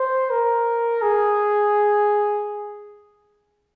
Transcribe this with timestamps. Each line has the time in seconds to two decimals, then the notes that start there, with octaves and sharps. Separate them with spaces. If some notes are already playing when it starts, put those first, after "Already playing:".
Already playing: C5
0.31 A#4
1.02 G#4